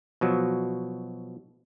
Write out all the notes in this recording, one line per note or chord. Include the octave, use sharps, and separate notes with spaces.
B2 F3 F#3